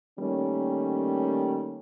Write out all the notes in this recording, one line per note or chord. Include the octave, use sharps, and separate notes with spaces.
D#3 G3 A3 A#3 C#4